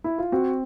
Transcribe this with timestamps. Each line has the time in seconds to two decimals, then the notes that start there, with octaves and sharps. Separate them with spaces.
0.04 E4
0.18 F4
0.32 C4 F#4